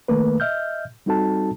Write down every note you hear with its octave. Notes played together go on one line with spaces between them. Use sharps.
D#3 A3 A#3 B4
D#5 E5 F6 G6
G3 C4 D#4 F#4 A4 A5